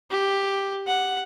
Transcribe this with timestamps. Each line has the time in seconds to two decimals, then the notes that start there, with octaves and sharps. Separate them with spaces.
0.10 G4
0.87 F#5